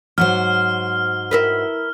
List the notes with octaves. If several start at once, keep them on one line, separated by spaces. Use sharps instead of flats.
G#2 F#3 C5 F6
E4 A#4 B4